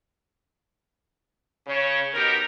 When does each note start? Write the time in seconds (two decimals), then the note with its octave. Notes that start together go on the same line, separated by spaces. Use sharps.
1.67 C#3 C#5
2.14 B2 D#4 G4 A#4